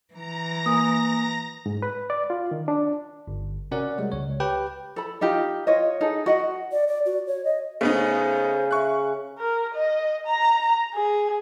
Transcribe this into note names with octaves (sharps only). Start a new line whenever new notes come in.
E3 A#5 A#6
A#3 G#5 D#6
G#2
B4
D5
F4
D#3
D4
G1
C3 C#4 F#4 A#4 D5 F#5
G3 G#3
C#2 C#5
G4 B4 G5
A4 B5
D#4 F4 G4
F4 C#5 D#5
D#4 G#4 A4
F#4 D#5 F#5
D5
D5
F#4
C#5
D#5
C#3 A3 B3 D#4 C5
E5 C#6 F#6
A#4
D#5
A#5
G#4